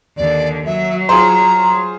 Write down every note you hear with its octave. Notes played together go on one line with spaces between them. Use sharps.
D#2 D3 D5
F#3 E5
F4 G#4 C5 A#5